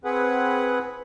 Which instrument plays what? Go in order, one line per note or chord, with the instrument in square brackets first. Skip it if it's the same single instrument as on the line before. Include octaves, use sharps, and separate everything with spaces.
[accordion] C4 G#4 B4 F#5